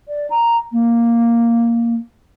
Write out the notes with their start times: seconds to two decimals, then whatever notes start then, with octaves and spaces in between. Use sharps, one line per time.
0.08 D5
0.30 A#5
0.72 A#3